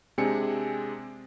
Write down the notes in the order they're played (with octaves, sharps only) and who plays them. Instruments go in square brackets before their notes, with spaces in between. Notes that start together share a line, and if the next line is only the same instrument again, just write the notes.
[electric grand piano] C3 G#3 C4 D4 G#5 C#7